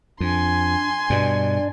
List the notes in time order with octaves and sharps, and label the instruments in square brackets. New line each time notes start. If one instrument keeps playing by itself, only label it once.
[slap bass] F2 [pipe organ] D4 [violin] G#5 C6
[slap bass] G2 B2 [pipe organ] D4 D5